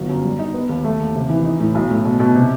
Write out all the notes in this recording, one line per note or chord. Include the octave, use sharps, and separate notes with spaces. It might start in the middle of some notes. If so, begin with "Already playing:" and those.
Already playing: G1 F#3
F#2
G3
D#4
B3
D#2
A3
D#2
C3
E3
D#4
A2
B1
A2
B2
B2
C3